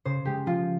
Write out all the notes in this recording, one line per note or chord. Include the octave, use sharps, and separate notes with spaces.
C#3 C5
G#3 G4
F3 F4